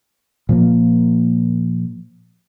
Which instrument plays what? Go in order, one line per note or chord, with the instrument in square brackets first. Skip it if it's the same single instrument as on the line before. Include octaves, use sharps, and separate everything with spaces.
[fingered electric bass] A#2 F3 A#3